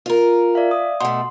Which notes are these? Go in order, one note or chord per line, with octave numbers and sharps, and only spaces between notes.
F4 A#4
D5 E5 F5
D#6
B2 A3 C6